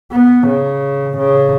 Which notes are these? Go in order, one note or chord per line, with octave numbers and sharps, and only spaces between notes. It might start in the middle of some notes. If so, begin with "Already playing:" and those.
B3
C#3
C#3